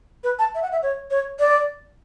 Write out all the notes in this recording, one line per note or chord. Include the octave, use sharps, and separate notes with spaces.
B4
A5
E5
F#5
E5
C#5
C#5
D5